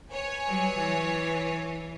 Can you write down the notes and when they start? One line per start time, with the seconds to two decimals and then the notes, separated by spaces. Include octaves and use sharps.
0.11 B4 C#5 G#5
0.46 F#3 G3
0.77 E3